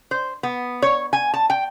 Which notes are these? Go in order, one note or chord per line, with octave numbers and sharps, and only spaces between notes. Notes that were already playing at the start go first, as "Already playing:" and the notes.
C5
B3
C#5
G#5
A5
G5